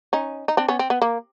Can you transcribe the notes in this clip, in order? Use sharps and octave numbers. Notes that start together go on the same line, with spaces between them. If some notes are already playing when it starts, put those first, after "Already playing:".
C#4 D#4
D#4
C4 D4
B3 C#4
C4
B3
A#3